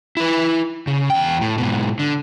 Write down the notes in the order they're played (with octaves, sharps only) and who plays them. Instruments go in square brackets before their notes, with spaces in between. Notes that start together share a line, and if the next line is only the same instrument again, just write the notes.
[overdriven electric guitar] E4 B4
C#3
E2 G5
A2
G#2 B2
D3